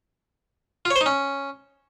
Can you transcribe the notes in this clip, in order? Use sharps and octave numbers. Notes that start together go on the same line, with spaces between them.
F4
C#5
C5
D#4
C#4